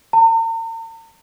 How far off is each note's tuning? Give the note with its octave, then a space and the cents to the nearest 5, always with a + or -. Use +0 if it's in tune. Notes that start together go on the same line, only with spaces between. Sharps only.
A#5 -45